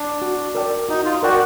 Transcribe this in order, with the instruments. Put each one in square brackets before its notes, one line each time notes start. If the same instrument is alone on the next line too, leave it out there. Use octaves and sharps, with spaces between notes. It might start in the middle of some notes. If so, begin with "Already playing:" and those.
Already playing: [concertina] D4
[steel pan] F#4
A#4 D5 G5
[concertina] D#4 [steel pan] F#4
[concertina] F4
[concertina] F#4 [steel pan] A#4 D5 G5